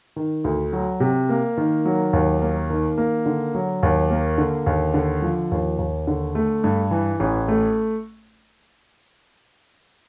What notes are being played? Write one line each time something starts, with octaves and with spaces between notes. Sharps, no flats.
D#3
D2
F#3
C3
A#3
D#3
F#3
D#2
A#3
D#3
A#3
D3
F#3
D#2
A#3
D3
D#2
D3
F3
D#2
D#2
D3
A3
G2
E3
A1
A3